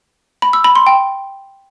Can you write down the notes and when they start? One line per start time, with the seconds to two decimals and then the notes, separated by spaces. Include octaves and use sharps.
0.42 B5
0.53 E6
0.64 B5
0.75 C6
0.87 G5